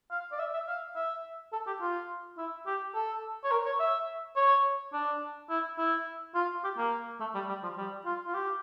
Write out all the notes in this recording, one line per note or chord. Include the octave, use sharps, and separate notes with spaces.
F5
D5
E5
E5
F5
E5
A4
G4
F4
E4
G4
A4
C#5
A#4
C#5
E5
C#5
D4
E4
E4
F4
G4
A#3
A3
G3
G3
F3
G3
F4
F4
G4